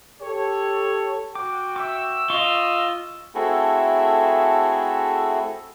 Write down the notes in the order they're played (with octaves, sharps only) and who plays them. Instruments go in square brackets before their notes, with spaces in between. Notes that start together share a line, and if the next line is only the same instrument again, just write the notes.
[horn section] G4 A4 C#5
[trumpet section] F#4 G5 [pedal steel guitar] D6
[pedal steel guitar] E5 C#6 D6 [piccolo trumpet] E6
[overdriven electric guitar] F4 [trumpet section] D#5 [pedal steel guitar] C#6 F6
[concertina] A3 C4 E4 F#4 G#4 A4